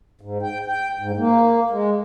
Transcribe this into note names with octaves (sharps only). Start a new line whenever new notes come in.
G#2
G5
G5
G#2
A#3
G#3